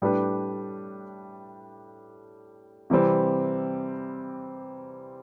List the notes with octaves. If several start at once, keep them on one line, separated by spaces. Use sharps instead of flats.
A2 G3 D4 G4 B4
C3 E3 G3 C4